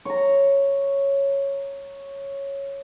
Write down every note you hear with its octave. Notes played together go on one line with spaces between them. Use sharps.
C#5 A#5